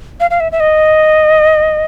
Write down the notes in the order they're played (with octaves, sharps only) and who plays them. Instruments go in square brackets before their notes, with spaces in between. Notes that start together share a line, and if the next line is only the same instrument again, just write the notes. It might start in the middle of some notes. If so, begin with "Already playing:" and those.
[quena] F5
F5
E5
E5
D#5